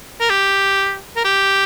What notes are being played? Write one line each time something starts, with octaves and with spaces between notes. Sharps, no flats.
A#4
G4
A#4
G4